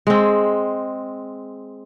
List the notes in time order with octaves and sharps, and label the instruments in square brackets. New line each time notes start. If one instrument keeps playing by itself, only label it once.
[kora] G#3 C4